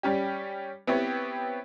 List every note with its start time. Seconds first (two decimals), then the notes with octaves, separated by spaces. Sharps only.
0.03 G3 C#4 G4
0.87 B3 C4 E4 G4 C#5